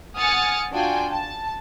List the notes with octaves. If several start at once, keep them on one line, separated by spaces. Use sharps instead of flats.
F#5 G#5 D#6 F6 A6 C#7
D4 F4 F#4 G5 G#5
A5